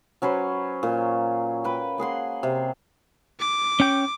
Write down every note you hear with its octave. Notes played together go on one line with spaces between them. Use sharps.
F#3 C#4 B4 C5
A#2
B4 G5
A#3 G#4 F#5 C6
C3
D6
C#4 G5